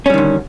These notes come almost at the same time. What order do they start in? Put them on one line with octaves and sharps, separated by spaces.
C#4 G3 D#3 D3